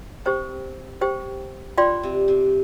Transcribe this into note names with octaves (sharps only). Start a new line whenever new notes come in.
C4 G4 C5 G5
G4 C5 G5
D4 F4 D5 G5 C6
C3
C3